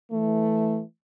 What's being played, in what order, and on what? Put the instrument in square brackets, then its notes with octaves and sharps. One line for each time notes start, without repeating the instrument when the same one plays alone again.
[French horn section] E3 A3